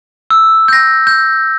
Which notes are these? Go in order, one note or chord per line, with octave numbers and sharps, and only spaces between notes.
E6
G6 A#6
G6